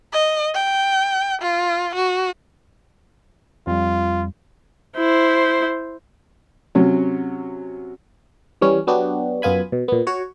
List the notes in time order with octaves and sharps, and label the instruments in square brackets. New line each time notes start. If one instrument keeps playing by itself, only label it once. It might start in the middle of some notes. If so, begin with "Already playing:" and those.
[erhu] D#5
G5
F4
F#4
[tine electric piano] F2 G3 [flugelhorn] F4
[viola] E4 C5
[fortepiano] C3 F#3 C#4
[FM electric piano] E3 G3 C#4
F#3 B3 D4 F#4 G4
F#2 B3 F4 G#5 B5
B2
A#2 B3
F#4 C#5